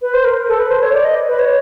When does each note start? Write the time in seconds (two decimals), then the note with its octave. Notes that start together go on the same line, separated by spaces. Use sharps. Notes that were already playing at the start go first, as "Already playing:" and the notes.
0.02 B4
0.14 C5
0.25 A#4
0.48 A4
0.59 B4
0.70 C5
0.82 C#5
0.93 D5
1.04 D#5
1.28 B4
1.39 C#5